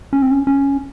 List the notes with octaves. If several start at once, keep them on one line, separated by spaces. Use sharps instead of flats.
C#4
C4
C#4
C#4